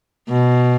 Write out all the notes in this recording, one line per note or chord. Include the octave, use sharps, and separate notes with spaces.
B2